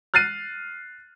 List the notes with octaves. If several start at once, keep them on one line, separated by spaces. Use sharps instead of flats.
F6 F#6 A6 C7 D#7